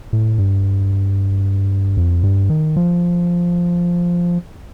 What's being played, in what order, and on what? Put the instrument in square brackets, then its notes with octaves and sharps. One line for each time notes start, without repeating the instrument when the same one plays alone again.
[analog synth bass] A2
G2
F2
G2
D#3
F3